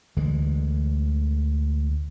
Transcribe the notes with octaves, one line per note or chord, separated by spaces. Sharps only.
D2 D3 E3 G#3